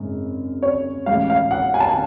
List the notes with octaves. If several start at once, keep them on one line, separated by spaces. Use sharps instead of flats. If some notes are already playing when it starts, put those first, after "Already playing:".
Already playing: G#1 F#2 C#3 G#3
C#5
A1 A2 G#3 F5
F5
F#5
G#5
A5
G#5